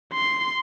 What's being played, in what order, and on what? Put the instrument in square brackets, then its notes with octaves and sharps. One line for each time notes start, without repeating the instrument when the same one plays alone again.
[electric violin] C6